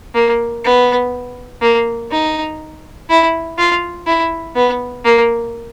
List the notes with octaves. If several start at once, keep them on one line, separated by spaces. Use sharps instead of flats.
A#3
B3
A#3
D#4
E4
F4
E4
B3
A#3